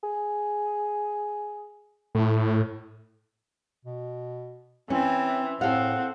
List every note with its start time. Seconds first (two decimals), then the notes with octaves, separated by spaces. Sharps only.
0.03 G#4
2.15 A2 A3
3.85 B2
4.90 E3 C4 C#4
5.61 A2 C4 A4 F5 F#5